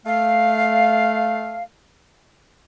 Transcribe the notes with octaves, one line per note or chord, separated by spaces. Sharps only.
A3 F5